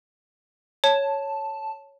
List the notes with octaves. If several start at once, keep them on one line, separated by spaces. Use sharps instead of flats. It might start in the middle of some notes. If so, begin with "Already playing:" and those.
C#5 A5